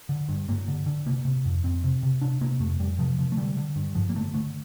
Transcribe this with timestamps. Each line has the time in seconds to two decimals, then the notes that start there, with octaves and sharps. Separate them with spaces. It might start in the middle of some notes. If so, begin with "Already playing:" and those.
0.09 D3
0.29 G2
0.48 G2 A#3
0.68 D3
0.86 D3
1.06 C3 A#3
1.25 C3
1.45 F2
1.64 F2 C4
1.84 C3
2.03 C3
2.22 C3 D4
2.41 C3 A#3
2.60 F2 A3
2.79 F2 G3
2.99 C3 F3
3.18 C3 F3
3.32 A3
3.37 D3 G3
3.57 D3
3.76 G2
3.95 G2 F3
4.09 A#3
4.15 D3 A3
4.34 D3 A3